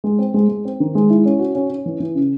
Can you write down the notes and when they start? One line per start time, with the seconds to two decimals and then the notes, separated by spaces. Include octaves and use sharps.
0.04 G#3
0.19 C4
0.34 G#3
0.49 G#3
0.65 C4
0.80 D#3
0.95 G#3
1.10 E4
1.25 C#4
1.39 F#4
1.55 C#4
1.70 C#4
1.86 E3
2.00 E3
2.15 C#3